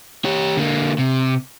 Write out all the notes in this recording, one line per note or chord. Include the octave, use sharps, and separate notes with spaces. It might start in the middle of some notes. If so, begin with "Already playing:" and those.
G4 C#5
D3 A#3
C3